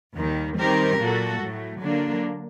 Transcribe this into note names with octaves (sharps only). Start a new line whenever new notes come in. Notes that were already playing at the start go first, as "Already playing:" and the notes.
D#2 D#3 G3
D#3 G3 C4 G4 A#4
A#2 F#3 A#3 F#4 A4
A2 F#3 A3
D3 F#3 A#3 D4